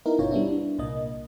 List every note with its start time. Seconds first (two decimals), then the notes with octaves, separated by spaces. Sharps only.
0.06 B3 D#4 E4 A#4
0.19 G1 B2 C#4 F4 C#5
0.31 G3 B3 D4 E4
0.48 D4
0.78 C2 A#2 A#3 D#5